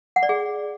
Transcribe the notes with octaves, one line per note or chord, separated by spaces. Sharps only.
F#5
D5
G#4